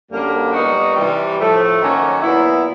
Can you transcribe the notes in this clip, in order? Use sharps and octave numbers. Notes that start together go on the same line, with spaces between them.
F#2 D3 G3 A#3
A#2 G3 B3 D#4 F#4
C3 E3 G3
A2 F3 A3
D#3 F#3 A#3 C#4 F#4
A#2 F#3 B3 E4